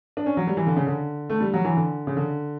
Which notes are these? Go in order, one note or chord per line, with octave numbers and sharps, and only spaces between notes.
D4
C#4
F#3
G3
E3
D3
C#3
D3
A3
G3
F#3
E3
D3
C#3
D3